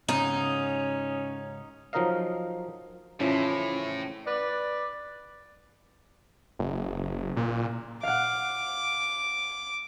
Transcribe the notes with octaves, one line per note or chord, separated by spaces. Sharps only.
G#2 C#3 C#4 D#4
F3 F#3 D#4 A#4 D#5 F5
A2 C#3 E3 F3 C#4
B4 D5
F#1
A#2
F5 F#5 D6